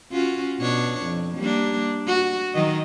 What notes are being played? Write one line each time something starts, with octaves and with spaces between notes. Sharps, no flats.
C#4 F4 F#4
B2 D4 C#5
F2
G3 A#3 D4
F#4
D#3 F#3 D#5